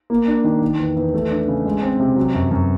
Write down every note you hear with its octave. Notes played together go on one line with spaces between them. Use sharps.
A#3
D4
D#3
D#3
E2
E2
A3
D4
C#3
G#3
C4
C3
F#3
F#2
F#2